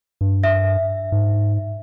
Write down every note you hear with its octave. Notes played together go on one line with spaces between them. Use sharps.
G2
E5
G#2